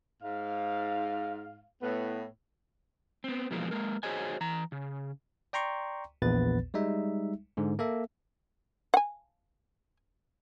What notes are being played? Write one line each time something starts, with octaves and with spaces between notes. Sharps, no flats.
G#2 F5
A2 B3
B3 C4
B2 E3 F3 G#3 A#3
G#3 A#3 A#4
F#4 G#4 C5 C#5 D#5 G#5
E3 A#5
C#3
D5 G5 A#5 C6 C#6
A#1 E2 A#2 B3 B4 A6
G3 G#3 D#4 E5
G#2 D3
A#3 A4 E5
F#5 G#5